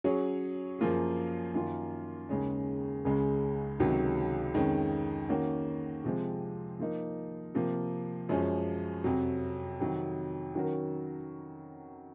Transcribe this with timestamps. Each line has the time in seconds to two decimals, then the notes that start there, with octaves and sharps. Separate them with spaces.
0.04 F#3 C#4 G#4 C#5
0.79 F#2 F3 A#3 F4 G#4
1.54 F#2 D#3 A#3 F4
2.29 D#2 C#3 G#3 C#4
3.05 C#2 C#3 G#3 C#4
3.80 C#2 C3 D#3 F#3
4.54 F2 D#3 G#3 C#4
5.29 D#3 A#3 C#4 F#4
6.04 C3 F3 G#3 C4
6.79 F3 A#3 D#4
7.54 C3 F3 A#3
8.29 F#2 F3 G#3 C#4
9.04 F2 C3 F#3
9.80 F2 C3 D#3 F#3
10.55 D#3 F#3 C#4 F#4 A#4